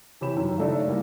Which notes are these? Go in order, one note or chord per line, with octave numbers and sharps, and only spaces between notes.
C3 E3 G4 C#5 B5 E7
F#2 D#3
C#3 A3 D4 D#4
C2 A#3